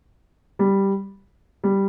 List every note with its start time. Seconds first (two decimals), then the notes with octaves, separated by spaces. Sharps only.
0.59 G3
1.64 G3